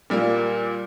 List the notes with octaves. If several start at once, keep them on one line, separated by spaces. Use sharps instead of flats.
A#2 G3 A#3